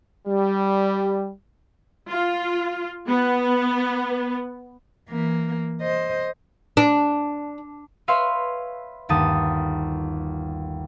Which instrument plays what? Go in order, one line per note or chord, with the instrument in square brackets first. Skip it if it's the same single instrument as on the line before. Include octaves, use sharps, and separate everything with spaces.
[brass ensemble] G3
[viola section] F4
B3
[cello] E3 A#3
C5 D#5
[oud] D4
[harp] B4 C#5 E5 F5 B5 C6
G1 D#2 A5 D#6